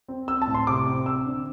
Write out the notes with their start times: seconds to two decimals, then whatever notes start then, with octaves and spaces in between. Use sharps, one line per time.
0.08 C4
0.28 C4 E6
0.42 A5
0.47 A2
0.54 C6
0.67 C3 D6
0.86 C4
1.06 C4 E6
1.26 D3